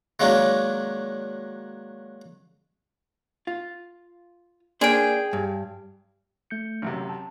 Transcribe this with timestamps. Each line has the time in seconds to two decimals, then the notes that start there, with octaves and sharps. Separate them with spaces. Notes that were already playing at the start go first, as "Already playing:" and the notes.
0.20 D#3 F#3 G#3 A#3 C#4 D4
3.47 F4
4.81 A#3 D4 G#4 C5 G5
5.33 G2
6.50 A3 G6 C#7
6.82 A1 F#2 C3
7.09 A5